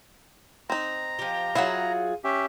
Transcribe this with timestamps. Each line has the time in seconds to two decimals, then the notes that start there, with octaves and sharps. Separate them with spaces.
0.70 C4 D#4 A#5
1.19 F3 G4
1.55 F#3 E4 F4 G#4 F#5
2.24 C#4 G4 E5